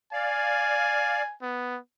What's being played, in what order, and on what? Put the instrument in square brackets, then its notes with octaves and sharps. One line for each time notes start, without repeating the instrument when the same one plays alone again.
[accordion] D5 F5 [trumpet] G#5
[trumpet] B3